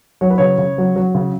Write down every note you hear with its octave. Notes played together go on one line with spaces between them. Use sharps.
F#3 C#5
B4
C#3 C#5
C#3
F#3
F#3
C#3